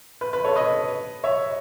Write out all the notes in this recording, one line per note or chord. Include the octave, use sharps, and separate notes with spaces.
B4
B4
A4 C#5
B4 D#5
C#5 E5